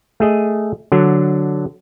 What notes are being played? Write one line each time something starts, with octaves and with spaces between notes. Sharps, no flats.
A3 G#4 D#5
D3 F#3 D4